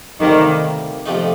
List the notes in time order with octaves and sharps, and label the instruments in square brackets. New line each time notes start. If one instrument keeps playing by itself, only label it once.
[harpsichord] D2 C3 G3 A#3 [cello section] D#3
[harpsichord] F2 C3 F3 A3 D#4